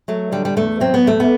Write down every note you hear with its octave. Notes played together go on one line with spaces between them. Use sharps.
F#3 A3
D3 G3
G3
E2 A3
F#3 C4
B3
E2 A3
B3